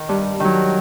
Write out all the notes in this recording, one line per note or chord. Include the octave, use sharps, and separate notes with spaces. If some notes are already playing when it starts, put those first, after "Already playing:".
Already playing: D#3
G2
D#3 F#3